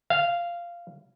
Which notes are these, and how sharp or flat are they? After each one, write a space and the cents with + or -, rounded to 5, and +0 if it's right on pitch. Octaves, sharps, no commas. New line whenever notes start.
F5 -10